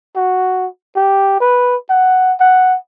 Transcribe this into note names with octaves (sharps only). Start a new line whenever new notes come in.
F#4
G4
B4
F#5
F#5